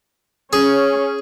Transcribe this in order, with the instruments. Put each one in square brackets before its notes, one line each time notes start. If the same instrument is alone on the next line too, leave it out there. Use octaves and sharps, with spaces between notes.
[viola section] C#4 [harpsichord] G#4